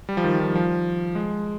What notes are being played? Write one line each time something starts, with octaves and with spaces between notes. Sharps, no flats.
G3
F3
D#3
F3
F3
G#3